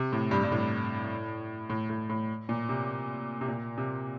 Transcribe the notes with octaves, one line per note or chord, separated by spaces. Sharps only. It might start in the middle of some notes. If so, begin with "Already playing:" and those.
Already playing: C3
A2
G2
G2
A2
A2
A2
A2
A#2
C3
C3
A#2
C3